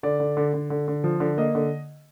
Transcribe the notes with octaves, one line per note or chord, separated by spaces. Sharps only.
D3 D5
D3
D3
D3
D3
D3
F3
D3
A#3 D#5
D3